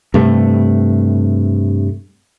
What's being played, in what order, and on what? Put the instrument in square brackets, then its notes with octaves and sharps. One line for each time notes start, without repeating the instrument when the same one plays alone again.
[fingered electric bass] G2 C3 A3